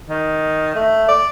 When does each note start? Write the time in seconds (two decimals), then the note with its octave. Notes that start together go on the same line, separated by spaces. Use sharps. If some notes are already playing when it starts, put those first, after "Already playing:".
0.09 D#3
0.75 A3
1.08 D5